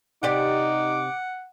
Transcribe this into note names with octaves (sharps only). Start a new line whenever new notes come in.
C3 D#4 G4 D5 F#5 D6